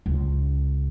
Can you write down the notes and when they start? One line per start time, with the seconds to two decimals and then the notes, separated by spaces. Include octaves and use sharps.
0.06 C#2